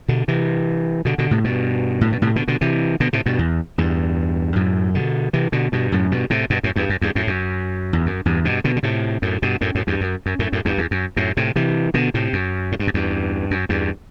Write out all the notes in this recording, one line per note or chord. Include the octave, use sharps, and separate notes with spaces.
B2 D3
C3 E3
B2 D3
B2 D3
A2 C3
G2 B2
A2
B2
A2 C3
B2 D3
B2 D3
C3 E3
B2 D3
A2 C3
G2 B2
E2
E2 G2
F#2 A2
B2 D3
C3 E3
B2 D3
G2 B2
F#2 A2
G2 B2
A2 C3
G2 B2
F#2 A2
E2 G2
F#2
E2 G2
F#2 A2
F#2
E2
F#2
E2 G2
G2 B2
B2 D3
D3
A2 C3
F#2 A2
G2 B2
F#2 A2
F#2 A2
E2 G2
F#2
F#2
F#2 A2
F#2 A2
E2 G2
E2
F#2
F#2 A2
A2 C3
C3 E3
B2 D3
A2 C3
F#2
A2
G2
F#2
E2 G2
F#2
E2 G2